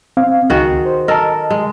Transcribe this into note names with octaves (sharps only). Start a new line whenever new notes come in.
C4 F5
C#2 D#3 F#4 G#4
C5
A4 A#4 D#5 A5
G#3